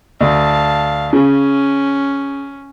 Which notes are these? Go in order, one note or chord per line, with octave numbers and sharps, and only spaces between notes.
D2 F5 A5
C#3 C#4